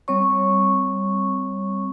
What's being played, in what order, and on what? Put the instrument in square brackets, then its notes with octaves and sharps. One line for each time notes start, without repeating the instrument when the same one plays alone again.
[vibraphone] G3 C4 C#5 C#6